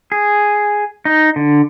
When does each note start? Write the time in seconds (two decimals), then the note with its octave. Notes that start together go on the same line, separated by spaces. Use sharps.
0.12 G#4
1.05 D#4
1.36 D3